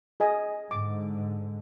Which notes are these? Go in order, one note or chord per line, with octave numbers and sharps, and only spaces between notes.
G#4 D#5 G#5
G#2 D3 D6